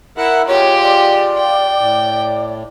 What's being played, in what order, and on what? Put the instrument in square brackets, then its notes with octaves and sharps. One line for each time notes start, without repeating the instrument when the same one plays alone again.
[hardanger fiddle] E4 [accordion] A#4 F#5 F#6 [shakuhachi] E5
[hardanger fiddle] G#3 G4 [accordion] F4 [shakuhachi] C#5
[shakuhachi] D5
[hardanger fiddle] G5
[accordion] A2